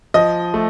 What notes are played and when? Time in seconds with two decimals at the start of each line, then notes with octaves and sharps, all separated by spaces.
0.14 F3 D#5
0.54 A3